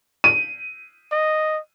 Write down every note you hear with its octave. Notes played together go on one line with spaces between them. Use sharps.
D#7
D#5